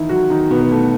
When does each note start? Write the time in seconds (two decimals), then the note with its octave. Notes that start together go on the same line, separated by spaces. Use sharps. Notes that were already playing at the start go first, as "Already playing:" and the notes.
Already playing: D#3 E3 D#4 E4
0.09 F#3 F#4
0.30 D#3 D#4
0.50 B2 B3
0.61 B3
0.71 A3